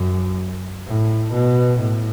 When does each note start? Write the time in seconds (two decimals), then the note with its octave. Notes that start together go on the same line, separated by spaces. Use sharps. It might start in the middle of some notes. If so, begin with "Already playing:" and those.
Already playing: F#2
0.87 A2
1.34 B2
1.81 A2